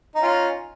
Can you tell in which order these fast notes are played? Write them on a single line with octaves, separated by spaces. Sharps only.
D#4 C#4 F4